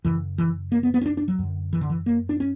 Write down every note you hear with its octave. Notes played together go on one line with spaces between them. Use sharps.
F#2 C#3 E3
E3
A#3
B3
B3
C#4
D4
D4
F#3
F#2 D3
E3
D3
E3
A#3
D4
C#4